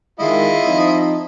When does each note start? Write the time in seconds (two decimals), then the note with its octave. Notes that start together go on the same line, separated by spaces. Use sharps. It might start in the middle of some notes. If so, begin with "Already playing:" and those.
0.20 D#3 G#3 E4 F4 D#5
0.65 F3 C4 D#4